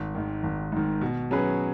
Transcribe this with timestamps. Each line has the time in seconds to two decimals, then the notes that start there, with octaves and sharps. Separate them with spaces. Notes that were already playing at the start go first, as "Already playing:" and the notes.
Already playing: G#1
0.15 G#2 D#3
0.43 G#1
0.72 G#2 D#3
1.01 B2
1.31 F#3 C#4 G#4 B4